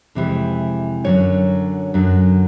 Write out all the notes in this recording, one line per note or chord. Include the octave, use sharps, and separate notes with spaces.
F2 C3 E3 G#3
F#2 D3 F#3 C#5
F#2 D3 F#3